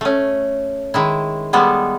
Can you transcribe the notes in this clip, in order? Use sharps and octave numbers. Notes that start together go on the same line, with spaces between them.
A3 C#4
D#3 G#3 E4
G3 G#3 B3 A4